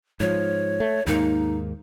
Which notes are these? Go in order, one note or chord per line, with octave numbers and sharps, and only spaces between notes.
G#2 F3 C#5
A3
D#2 G#2 A#3 D#4